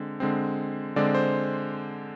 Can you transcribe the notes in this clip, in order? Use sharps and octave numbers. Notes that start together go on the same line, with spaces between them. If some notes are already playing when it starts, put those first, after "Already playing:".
Already playing: D3 G#3 C4
D3 G#3 C4
D3 G#3 C4 D5
C5